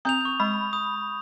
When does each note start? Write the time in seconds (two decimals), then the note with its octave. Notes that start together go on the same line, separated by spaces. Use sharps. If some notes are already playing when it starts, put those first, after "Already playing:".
0.05 C4 A#5 D#6 G6 F7
0.21 C#6 F7
0.40 G#3 B5
0.73 D#6